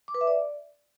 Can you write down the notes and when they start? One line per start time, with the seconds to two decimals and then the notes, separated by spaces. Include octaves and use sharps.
0.08 D6
0.14 B4
0.21 E5
0.27 D5